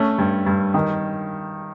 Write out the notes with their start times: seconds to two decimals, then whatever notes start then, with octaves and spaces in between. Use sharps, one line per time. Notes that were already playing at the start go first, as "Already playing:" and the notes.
Already playing: A3 C#4
0.18 G2
0.46 G2
0.74 D#3